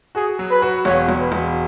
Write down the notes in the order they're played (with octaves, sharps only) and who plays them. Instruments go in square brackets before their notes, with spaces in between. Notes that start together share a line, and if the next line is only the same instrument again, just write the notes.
[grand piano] F#4 [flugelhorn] G#4
[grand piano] F#3
[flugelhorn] B4
[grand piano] F#4
[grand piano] E1 [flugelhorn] C#5
[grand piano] E1
[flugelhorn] B4
[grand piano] E1